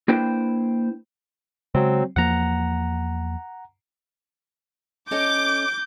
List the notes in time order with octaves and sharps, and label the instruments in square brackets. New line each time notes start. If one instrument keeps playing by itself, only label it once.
[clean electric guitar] A#3 D4 E4 B4 C5 G5
[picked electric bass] C#3 G#3 [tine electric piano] F#3 C4
[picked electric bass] E2 F3 A#3 [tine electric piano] F#5 A#5
[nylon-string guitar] C#4 A4 D#5 [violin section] D6 [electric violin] G6